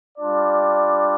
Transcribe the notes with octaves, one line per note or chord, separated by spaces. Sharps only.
G3 D4 F4 D5